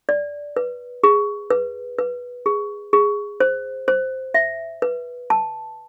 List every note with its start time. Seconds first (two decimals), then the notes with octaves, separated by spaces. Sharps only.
0.09 D5
0.56 B4
1.04 G#4
1.50 B4
1.98 B4
2.46 G#4
2.93 G#4
3.40 C5
3.88 C5
4.34 E5
4.82 B4
5.30 A5